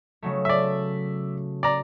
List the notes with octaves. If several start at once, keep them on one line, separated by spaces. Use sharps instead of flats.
C#3 F#3 A3
D5 E5
D5 A#5